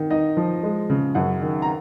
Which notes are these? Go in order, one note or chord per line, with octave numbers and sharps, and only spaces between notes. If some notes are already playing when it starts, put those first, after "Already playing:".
Already playing: D#3
D#4 D#5
F3
G#3
C#3
F#2 F#5
D#3
A#5